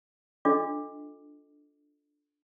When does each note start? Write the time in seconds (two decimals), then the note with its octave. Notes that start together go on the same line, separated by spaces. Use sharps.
0.45 D4 F4 A4 D#5 D6